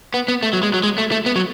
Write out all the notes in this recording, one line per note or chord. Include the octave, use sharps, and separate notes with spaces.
B3
B3
A3
F#3
G#3
F#3
G#3
A3
A3
B3
F#3